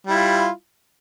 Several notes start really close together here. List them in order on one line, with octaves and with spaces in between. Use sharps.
G3 E4 F4